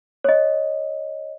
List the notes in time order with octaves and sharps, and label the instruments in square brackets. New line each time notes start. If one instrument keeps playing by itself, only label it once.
[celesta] C#5 D#5